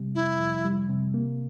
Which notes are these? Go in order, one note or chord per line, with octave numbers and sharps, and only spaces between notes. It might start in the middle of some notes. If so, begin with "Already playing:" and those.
Already playing: C3 G3
F2 E4
F2
G3
C3
A#3